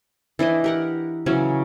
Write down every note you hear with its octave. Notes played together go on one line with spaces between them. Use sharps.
E3 D4 E4 D#5
G4 A#4 F#5
C#3 E3 F#3 C#4